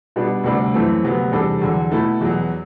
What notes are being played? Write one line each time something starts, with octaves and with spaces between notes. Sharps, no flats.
B2 G3 D4
D2 C3 G3 D4
F#2 E3 A3 C4
D2 C3 F#3 B3
E2 C3 G3 D4 A4
E2 D3 F#3
B2 A3 E4 A4
E2 B2 F#3